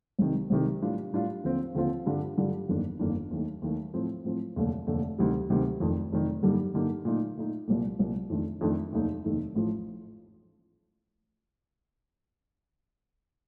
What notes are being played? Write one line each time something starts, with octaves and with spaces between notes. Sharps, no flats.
C2 C3 D#3
C2 C3 D#3
A2 G3 D4 F4
A2 G3 D4 F4
D#2 D3 F3 C4 F4
D#2 D3 F3 C4 F4
G2 D3 G3 D4 F4
G2 D3 G3 D4 F4
G1 F2 D#3 A#3 D4
G1 F2 D#3 A#3 D4
D#2 D#3 A3
D#2 D#3 A3
A2 F3 C4
A2 F3 C4
F1 D#2 D3 A3
F1 D#2 D3 A3
D2 C3 D#3 G3
D2 C3 D#3 G3
F1 F2 D#3
F1 F2 D#3
G2 D3 G3 A#3 D#4
G2 D3 G3 A#3 D#4
A#2 A3 D#4
A#2 A3 D#4
C2 A#2 G3 A#3
C2 A#2 G3 A#3
F2 D#3 A3 D4
F2 D#3 A3 D4
F1 D#2 D#3 A3 D#4
F1 D#2 D#3 A3 D#4
A1 A2 F3